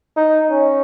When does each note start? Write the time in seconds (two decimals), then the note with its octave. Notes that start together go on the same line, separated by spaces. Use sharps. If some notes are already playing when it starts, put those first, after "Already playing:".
0.17 D#4
0.51 C#4